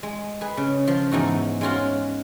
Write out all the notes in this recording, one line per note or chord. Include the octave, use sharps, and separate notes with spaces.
G#3
G#4 B4
C#3
F3
E2 G#2 D#4 F#4
G#3 C#4 F4 F#4 F5